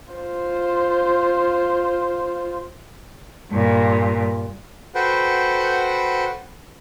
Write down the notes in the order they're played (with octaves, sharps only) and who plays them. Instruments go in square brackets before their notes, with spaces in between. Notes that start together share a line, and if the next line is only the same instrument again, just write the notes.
[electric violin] F4 C5
[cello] G2 A#2
[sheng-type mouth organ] F#4 A4 B4 C5 F#5 G5